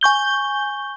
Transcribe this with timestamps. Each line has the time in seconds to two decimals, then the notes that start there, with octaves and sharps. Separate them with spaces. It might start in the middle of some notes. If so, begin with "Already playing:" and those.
0.01 G#5 C#6 G6 G7